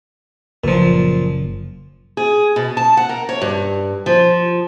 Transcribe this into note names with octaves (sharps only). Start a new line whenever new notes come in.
F#1 A#2 F3
G#4
B2
A5
F#5
A#4
C#5
G2
F3